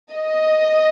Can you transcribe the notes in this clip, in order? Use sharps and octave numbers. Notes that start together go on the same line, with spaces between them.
D#5